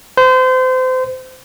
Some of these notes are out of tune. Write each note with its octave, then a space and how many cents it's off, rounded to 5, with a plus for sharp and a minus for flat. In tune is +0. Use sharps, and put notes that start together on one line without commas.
C5 -30